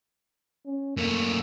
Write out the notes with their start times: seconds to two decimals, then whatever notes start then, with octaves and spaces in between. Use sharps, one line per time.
0.66 C#4
0.97 F#2 A3 A#3